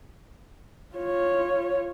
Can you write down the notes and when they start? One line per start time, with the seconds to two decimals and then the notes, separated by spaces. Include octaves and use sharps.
0.95 F4 C#5